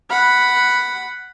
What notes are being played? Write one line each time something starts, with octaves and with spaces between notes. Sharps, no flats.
F#5 B5